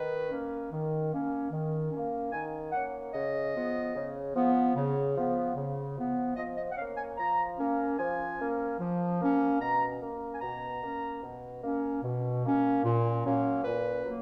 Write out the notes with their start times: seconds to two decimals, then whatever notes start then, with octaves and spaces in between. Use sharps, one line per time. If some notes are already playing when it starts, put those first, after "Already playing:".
Already playing: D#3 B4
0.30 A#3 C#4
0.70 D#3
1.11 A#3 C#4
1.51 D#3
1.91 C#4
1.96 A#3
2.32 D#3 G#5
2.72 A#3 C#4 F#5
3.13 C#3 D#5
3.54 F3 B3
3.94 C#3
4.34 F3 B3
4.75 C#3
5.15 F3 B3
5.55 C#3
5.96 F3 B3
6.36 F3 D#5
6.56 D#5
6.72 F#5
6.76 A#3 C#4 F5
6.96 G#5
7.17 F3 A#5
7.58 A#3 C#4
7.98 F3 G#5
8.39 A#3 C#4
8.79 F3
9.20 A#3 C#4
9.60 B2 A#5
10.01 A#3 C#4
10.34 G#5
10.40 B2 A#5
10.82 A#3 C#4
11.22 B2
11.62 A#3 C#4
12.03 B2
12.43 A#3 C#4
12.84 A#2
13.24 F#3 A#3 C#4
13.64 A#2 B4
14.04 F#3 A#3